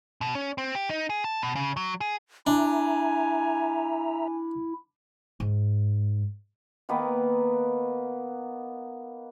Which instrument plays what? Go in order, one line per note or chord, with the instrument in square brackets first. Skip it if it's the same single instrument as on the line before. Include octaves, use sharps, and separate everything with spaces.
[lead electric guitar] B2
C#4
C4
G4
D#4
G#4
A5
B2
C#3
F#3
G#4
[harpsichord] D4 [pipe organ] E4 [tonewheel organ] E5 A#5 [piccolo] G#5
[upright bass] G#2
[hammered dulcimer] D#3 A#3 B3 B4